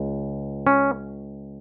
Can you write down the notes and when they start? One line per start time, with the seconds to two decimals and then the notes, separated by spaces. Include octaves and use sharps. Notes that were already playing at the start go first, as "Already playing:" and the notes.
Already playing: C#2
0.67 C#4